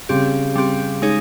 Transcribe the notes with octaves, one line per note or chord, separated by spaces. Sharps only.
C#3 G3 C4 G4
G3 C4 G4
G#3 D#4 G#4 C#5